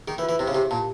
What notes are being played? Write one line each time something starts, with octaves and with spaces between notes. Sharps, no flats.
D#3 G#4
E3
F4
E3
C3 E4
C#3
C3 G4
A#2 A5